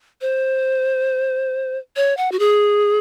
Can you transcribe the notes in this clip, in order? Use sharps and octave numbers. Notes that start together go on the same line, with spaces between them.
C5
C#5
F#5
F#4
G#4